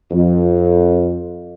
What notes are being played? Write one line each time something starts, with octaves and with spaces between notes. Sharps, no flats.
F2